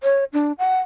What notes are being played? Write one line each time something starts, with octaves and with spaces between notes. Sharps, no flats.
C#5
D4
F#5